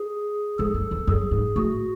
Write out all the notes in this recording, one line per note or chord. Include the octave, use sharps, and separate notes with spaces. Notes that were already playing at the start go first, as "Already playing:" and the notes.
Already playing: G#4
G#2 A4
F#2
E2
F#2 G#4
G#2
A2 F#4